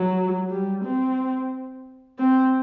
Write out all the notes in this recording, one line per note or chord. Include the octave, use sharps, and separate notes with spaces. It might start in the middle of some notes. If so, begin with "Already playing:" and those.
Already playing: F#3
G3
C4
C4